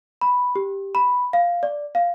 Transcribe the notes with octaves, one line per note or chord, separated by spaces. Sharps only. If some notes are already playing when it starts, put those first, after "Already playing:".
B5
G4
B5
F5
D5
F5